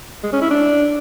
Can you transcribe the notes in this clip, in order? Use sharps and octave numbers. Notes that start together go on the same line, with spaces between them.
G#3
C#4
E4
D4